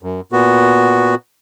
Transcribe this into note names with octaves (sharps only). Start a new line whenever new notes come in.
F#2
A#2 B3 F#4